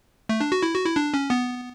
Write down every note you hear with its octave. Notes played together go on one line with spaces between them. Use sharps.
A3
D4
F#4
E4
F#4
E4
D4
C#4
B3